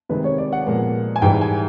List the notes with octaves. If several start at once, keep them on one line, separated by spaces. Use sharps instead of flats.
C3 D#3 G#3 C4 B4
C#5
D5
F#5
A#2 F3 G#3 B3
G#5
G#2 E3 G3 G5
G#5